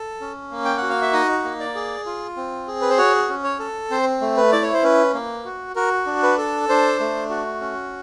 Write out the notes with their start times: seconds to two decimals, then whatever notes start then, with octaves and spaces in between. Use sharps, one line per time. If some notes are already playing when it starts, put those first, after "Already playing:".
Already playing: A4
0.21 C#4
0.51 A#3
0.65 G5
0.77 F#4 F#5
0.89 F5
1.02 E5
1.13 D#4 D#5
1.44 A#3
1.60 D5
1.75 G#4
2.06 F4
2.37 C4
2.68 G#4
2.82 B4
2.90 C5
2.98 F#4 C#5
3.30 C#4
3.44 C#5
3.59 A4
3.90 C4 C5
4.21 A3
4.37 B4
4.52 E4 D5
4.63 C#5
4.73 C5
4.83 C#4 B4
5.14 A#3
5.45 F#4
5.76 F#4 A#4
6.06 D4
6.23 B4
6.38 A4
6.69 D4 C5
7.00 A3
7.30 F#4
7.61 C#4